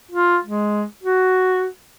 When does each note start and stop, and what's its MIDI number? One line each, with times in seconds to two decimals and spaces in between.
0.11 0.37 65
0.44 0.83 56
1.04 1.67 66